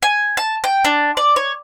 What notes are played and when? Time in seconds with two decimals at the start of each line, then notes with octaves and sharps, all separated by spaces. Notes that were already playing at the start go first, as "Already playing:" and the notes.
0.03 G#5
0.37 A5
0.64 G5
0.85 D4
1.17 D5
1.36 C#5